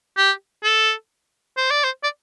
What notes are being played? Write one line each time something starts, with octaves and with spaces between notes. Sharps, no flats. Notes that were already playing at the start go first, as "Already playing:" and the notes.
G4
A4
C5
D5
C5
D5